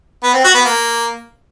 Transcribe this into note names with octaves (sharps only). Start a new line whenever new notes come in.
B3
C4
F#4
B3
A#3